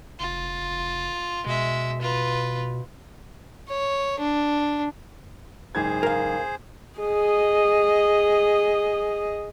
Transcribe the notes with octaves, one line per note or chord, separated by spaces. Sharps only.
F1 F4
B2 G#3 E5
F4 B4
C#5
D4
F#1 G#2 G#4 C5 G#6
A#4 F5
G#4 D#5